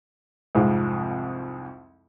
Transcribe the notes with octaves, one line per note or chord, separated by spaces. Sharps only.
C2 F2 G#2 F3 G#3